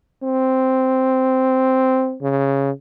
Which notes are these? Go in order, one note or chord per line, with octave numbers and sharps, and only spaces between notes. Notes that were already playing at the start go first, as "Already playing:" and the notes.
C4
C#3